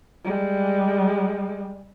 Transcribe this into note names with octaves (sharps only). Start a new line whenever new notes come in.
G3 G#3